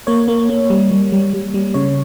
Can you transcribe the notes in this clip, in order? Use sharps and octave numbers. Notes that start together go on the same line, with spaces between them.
A#3 C#5
A#3
A#3
G3
G3
G3
G3
G3
C#3 C#5